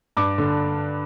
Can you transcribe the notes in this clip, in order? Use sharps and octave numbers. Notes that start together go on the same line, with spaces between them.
G2 D6
D3